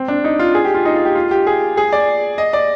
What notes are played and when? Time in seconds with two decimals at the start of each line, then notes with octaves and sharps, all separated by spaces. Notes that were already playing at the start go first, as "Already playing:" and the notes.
Already playing: C4
0.08 D4
0.24 D#4
0.39 F4
0.55 G#4
0.65 G4
0.74 F4
0.85 D#4
0.95 F4
1.05 G4
1.15 F4
1.31 G4
1.47 G#4
1.77 G#4
1.93 D5
2.38 D#5
2.53 D5